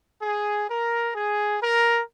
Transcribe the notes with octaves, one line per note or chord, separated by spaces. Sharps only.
G#4
A#4
G#4
A#4